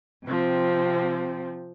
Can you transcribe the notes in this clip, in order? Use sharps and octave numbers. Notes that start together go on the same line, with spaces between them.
C3 F3 C4